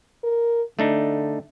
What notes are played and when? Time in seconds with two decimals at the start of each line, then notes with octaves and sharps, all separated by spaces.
0.24 A#4
0.79 D3 A3 D4 D#4